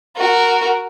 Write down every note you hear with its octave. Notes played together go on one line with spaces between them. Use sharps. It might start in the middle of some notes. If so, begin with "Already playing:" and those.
F#4 A#4